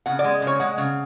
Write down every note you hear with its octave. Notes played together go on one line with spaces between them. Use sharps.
C#3 F#5
D5
G#3
C#3 C#5
G#3 F#5
C#3